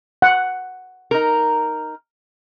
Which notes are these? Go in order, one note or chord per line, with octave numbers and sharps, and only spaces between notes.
F#5
D#4 A#4